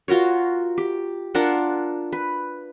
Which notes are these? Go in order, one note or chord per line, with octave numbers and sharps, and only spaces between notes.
F4 F#4 A#4 C#5
G4
D4 F4 A#4 F#5
B4